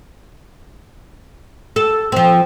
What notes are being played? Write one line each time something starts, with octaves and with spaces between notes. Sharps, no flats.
A4
F3 C4